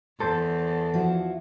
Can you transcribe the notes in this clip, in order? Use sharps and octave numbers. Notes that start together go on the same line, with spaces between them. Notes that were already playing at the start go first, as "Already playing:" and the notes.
E2 A4 C5
F3 E4 F#4